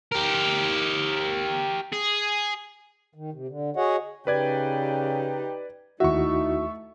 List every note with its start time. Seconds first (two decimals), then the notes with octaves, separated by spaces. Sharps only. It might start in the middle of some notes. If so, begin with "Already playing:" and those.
0.12 G4 A#4
1.92 G#4
3.14 D#3
3.33 C3
3.48 D3
3.77 F#4 G#4 C#5 D#5 F#5
4.27 C#3 D#4 G4 B4 D5 G#6
6.00 D#2 A3 D#4 E4 F#4 E5 C#6